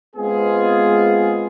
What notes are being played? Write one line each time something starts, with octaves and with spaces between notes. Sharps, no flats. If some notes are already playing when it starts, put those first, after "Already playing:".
G#3 B3 C4 F4 G#4